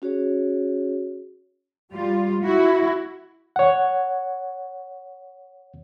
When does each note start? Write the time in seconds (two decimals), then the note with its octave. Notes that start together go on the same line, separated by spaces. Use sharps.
0.02 C#4 F#4 G#4 C#5
1.90 G3 F4
2.42 E4 F#4
3.56 C#5 F#5